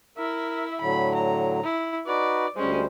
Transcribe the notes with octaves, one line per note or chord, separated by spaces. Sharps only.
E4 A#4 E5
A2 D3 F#3 B5
A#5
E4
D#4 F#4 B4 D5
D2 G3 G#3 C#4 C5